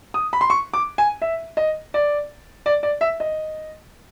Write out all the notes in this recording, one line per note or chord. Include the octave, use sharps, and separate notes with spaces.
D#6
B5
C6
C#6
D6
G#5
E5
D#5
D5
D5
D5
E5
D#5